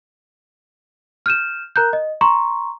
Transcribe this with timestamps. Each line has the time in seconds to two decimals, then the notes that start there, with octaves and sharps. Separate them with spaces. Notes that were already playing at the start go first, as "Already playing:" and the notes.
1.26 F6 G6 D#7 E7
1.76 A#4 A#5 F#6 G6
1.93 D#5
2.21 A#5 C6 C#6